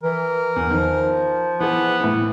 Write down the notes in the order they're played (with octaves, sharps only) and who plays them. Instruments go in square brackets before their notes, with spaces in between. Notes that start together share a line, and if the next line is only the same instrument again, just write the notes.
[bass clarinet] E3 [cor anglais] A#4
[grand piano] E2
[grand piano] D#3 [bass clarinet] F3
[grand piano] E3 G#4 [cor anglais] B3
[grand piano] A2 E3